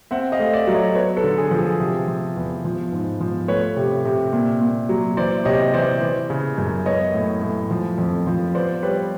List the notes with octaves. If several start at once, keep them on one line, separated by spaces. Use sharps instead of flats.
C4 E5 F#5
D#5 F5
A3
D5 E5
F#3
C#5 D#5
B3 B4 C#5
A4 B4
D3
G#4
F3
G#4
C3
F3
E2
F3
G#2
F3
A3 B4 C#5
C3
C3
A#2
A#2
F#3
E3 C5 D5
C3 C#5 D#5
E3 C5 D5
E3
C#3
F#2
B3 C#5 D#5
A2
A2
F3
F2
F3
B3 C5 D5
G3 B4 C#5